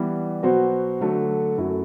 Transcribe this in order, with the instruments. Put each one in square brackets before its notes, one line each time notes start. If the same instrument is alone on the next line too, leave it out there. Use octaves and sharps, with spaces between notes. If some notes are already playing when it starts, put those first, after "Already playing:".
Already playing: [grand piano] E3 G3 B3
B2 F#3 B3 F#4 C5
D3 F#3 A3
F#2 F#3 A3 E4 A4